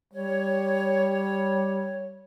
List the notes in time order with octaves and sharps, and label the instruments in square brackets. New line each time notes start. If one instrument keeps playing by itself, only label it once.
[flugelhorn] G3 [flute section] C#5